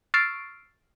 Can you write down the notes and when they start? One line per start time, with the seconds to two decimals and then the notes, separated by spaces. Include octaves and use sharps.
0.14 C#6 E6 F6 A6 C7 D7